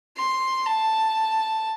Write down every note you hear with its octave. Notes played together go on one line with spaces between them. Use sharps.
C6
A5